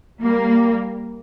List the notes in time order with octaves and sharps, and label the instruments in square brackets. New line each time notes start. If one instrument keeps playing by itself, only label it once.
[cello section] G3 A#3